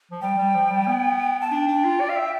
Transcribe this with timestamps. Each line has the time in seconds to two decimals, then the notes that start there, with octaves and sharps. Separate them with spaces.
0.11 F3
0.22 G3 G5
0.38 G3
0.55 F3
0.70 G3
0.87 B3
1.41 A5
1.51 D4 G5
1.68 D4
1.84 F4
2.01 D5
2.09 F5
2.16 E5